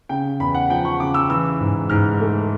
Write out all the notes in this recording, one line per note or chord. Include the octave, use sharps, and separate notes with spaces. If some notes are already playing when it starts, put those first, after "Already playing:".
C#3 G5
E2 B5
F#5
F3 G5
C#6
C#3 D6
E6
E3 E6
G#2
G#2 F6
A3